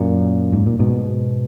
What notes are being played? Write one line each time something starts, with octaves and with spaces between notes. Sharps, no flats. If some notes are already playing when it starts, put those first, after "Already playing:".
Already playing: F#2 A#2
G#2
A#2
G#2 B2